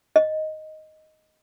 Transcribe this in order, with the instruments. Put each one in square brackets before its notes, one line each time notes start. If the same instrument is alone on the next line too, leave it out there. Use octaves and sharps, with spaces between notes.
[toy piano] D#5